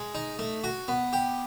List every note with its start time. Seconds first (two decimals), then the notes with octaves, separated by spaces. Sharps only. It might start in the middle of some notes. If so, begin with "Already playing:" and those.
Already playing: G#3
0.15 D#4
0.39 A3
0.64 F#4
0.88 B3
1.13 G4